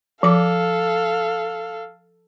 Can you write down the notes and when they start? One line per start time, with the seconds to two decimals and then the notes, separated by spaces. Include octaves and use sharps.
0.23 F3 A4 F5 D6